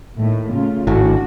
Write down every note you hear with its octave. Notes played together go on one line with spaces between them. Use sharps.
A2 D#3 A3
C#3 A3 F4
G#1 A2 D4 F#4